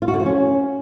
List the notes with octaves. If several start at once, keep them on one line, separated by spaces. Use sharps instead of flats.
F4
F#4
D3
F3
C#4